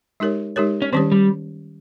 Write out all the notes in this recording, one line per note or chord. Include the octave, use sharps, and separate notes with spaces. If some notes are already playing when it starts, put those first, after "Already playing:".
G#3 D#4 G4 A#4 C#5
G#3 D#4 G4 A#4 C#5
C#4
D#3 G3 C4 C#4 G4 C#5
G3